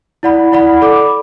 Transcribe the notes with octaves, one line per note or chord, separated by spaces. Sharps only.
E4 D5 F#5 B5
E4 D5 F#5 B5
A4 D5 B5 D6